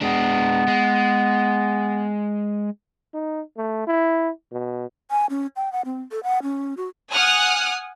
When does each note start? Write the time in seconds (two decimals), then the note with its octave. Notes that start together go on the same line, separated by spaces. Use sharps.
0.01 G#3 B3 D4
0.68 G#3
3.14 D#4
3.58 A3
3.87 E4
4.52 B2
5.11 G#5
5.30 C#4
5.56 G5
5.72 F#5
5.85 C4
6.11 A4
6.23 F#5
6.43 C#4
6.77 F#4
7.12 F#5 G#5 D#6 F6 F#6